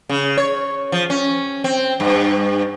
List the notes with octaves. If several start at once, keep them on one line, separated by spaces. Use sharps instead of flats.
C#3
C#5
F3
C#4
C4
G2